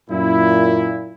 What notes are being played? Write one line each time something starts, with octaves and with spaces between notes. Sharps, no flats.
F#2 A#2 E4